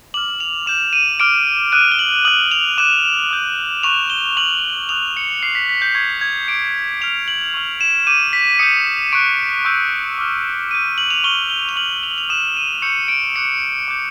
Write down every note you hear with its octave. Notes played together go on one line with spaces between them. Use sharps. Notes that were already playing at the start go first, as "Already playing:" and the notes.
D6 F6 F#7
F7
D6 G6 E7
D#7
D6 F6 D7
D#6 F#6 D#7
G7
F#7
D#6 F#6 F#7
F7
D6 F#6 E7
D#6 G6
C#6 F#6 F7
G7
C#6 F6 F#7
D#6 F#6 F7
C#7
D6 F6 C7
B6
B6
G6
C#6 F#6 G#6
G#6
D6 G6 D7
D6 F6 F7
F#7
C#6 F6
E7
D6 G6 D#7
B6
D#6 G6 C#7
C#6 F#6 D7
C#6 E6 G6
D6 F6
D#6 G6 D#7
F#7
F7
C#6 F6 G7
G7
F7
C#6 F6 F#7
F7
F#7
F7
D#6 F#6 E7
D#7
C#6 E6 G6 C#7
D7
D6 F#6 C#7
D6 G6